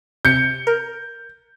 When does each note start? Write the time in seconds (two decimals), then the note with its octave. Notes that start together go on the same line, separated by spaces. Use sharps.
0.25 C3 G6 C#7
0.67 A#4